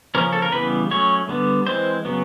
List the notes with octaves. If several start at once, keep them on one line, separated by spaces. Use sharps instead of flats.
C#3 F3 A#3 C#4 A#4
A4
A#4
C#3 E3 G3 B3 B4
F#3 A3 C#4 C#5
D3 G3 B3
E3 G#3 C4 C5
C#3 F#3 B3